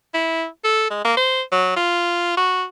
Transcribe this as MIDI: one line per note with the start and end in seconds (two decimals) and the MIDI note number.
0.14 0.46 64
0.64 0.87 69
0.90 0.99 56
1.05 1.15 58
1.17 1.41 72
1.52 1.72 54
1.76 2.34 65
2.37 2.64 66